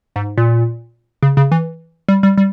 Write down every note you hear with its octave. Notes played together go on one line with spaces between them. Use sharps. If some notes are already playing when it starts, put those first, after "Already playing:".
G#2
A#2
C#3
C#3
E3
G3
G3
G3